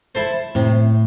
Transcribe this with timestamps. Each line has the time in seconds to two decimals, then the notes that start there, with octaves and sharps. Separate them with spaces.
0.15 E4 A4 C5
0.55 A2 C3